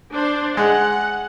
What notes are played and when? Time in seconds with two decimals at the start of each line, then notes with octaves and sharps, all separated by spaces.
0.13 D4 C5
0.57 G#3 F#5